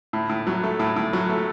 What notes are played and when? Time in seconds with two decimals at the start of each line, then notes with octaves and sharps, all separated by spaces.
0.13 A2
0.29 A2
0.47 F#3
0.64 A3
0.79 A2
0.96 A2
1.13 F#3
1.29 A3